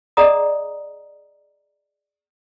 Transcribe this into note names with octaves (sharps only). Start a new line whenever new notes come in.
G#4 D5 D#5 F#5 A#5 D#6